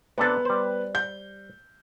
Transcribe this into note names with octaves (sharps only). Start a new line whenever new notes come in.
C3 B3 D4 A4 B4
G3 C5
G6